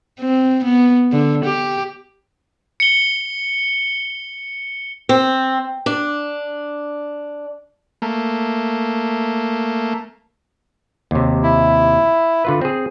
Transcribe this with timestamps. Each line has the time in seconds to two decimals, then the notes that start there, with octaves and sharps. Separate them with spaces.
0.20 C4
0.64 B3
1.12 D3
1.45 G4
2.80 C#7 G7
5.09 C4
5.86 D4
8.02 A3 A#3
11.11 D#2 C3
11.43 E4
12.45 D3 F4 B4
12.61 C4 G#4